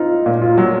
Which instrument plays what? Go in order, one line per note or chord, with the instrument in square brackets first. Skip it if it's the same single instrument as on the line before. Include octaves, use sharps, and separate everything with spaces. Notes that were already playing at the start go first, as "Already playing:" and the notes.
Already playing: [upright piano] C4 D#4 [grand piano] F4
[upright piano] A#2
[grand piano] F4
[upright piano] F#3